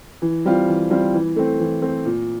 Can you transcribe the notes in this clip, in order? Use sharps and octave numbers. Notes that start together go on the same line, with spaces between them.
E3
G3 C4 F4
E3
G3 C4 F4
E3
A3 C4
E3
A3 C4
A#2